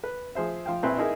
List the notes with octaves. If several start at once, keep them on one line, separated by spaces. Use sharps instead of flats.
B4
F3 G#4 C5 E5
F3 F5 G5
A#1 C4 E4 B4 G#5
D#4 E4 G#4 A#4 E5